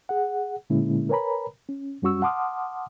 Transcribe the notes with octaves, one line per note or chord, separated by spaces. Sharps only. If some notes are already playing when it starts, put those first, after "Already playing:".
G#4 F#5
A#2 D3 G#3 A#3 C#4 E4
A#4 B4 C#5 G#5 A#5 B5
C#4
F#2 G3 C#4 F#4 C#6 E6
F#5 A5 C6 D6 D#6 F6